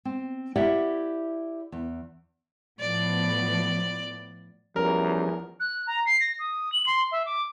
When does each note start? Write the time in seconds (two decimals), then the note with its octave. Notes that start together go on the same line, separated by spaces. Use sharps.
0.05 C4
0.56 E4 G4 D5 E5 F#5
1.72 E2
2.80 A2 F3 B3 D5
4.76 E2 F3 G3 C#4 A#4
5.60 F#6
5.87 A#5
6.06 C7
6.20 A#6
6.39 D#6
6.72 F#7
6.87 C6
7.12 E5
7.26 D6